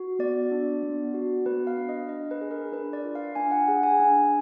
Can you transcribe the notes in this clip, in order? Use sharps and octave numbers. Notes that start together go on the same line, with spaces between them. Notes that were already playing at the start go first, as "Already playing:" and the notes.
Already playing: F#4
B3 D5
D4
B3
F#4
B3 B4
F5
D4
D#5
D4 D#5
B4
G#4
A#4
D4 B4
D5
F4
F5
D4 G#5
F#5
G#4 F#5
G#5
D4